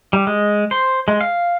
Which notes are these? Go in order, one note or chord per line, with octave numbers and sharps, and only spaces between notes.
G3
G#3
C5
G#3
F5